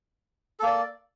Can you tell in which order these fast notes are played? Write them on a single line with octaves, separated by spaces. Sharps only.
A4 A#3 D5